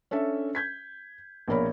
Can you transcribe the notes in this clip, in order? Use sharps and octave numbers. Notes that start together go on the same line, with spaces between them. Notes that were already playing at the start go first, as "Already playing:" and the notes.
C#4 D4 A4 E5
G6 G#6 B6
A#1 B2 A#3 A#4 C#5 B5